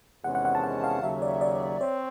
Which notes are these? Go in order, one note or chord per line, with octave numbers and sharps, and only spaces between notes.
E2 C3 D#3 G#3 C#4 F#5
F#5
F#5
A5
F#5
F5
D#2 C#3 F#3 E5
D5
D5
C4 C#5